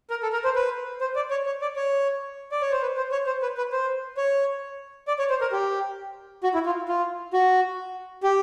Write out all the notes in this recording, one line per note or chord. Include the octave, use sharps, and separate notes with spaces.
A#4
A4
A#4
C5
B4
C5
D5
C#5
C#5
D5
C#5
D5
C#5
C5
B4
C5
C#5
C5
B4
B4
C5
C#5
D5
C#5
C5
A#4
G4
F#4
E4
F4
F4
F#4
G4